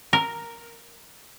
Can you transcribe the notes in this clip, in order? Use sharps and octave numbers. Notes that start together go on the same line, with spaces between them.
A#4